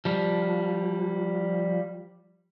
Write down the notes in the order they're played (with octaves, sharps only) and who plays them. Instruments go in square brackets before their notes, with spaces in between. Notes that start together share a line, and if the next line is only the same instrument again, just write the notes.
[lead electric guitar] F3 G3